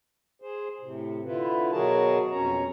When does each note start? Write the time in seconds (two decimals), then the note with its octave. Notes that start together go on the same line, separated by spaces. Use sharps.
0.42 G#4 C5
0.81 A2 C3
1.25 D3 E4 F4 B4
1.72 B2 F#3 F#4 G#4 A#4 A5
2.31 F2 B2 C#4 C#5 A#5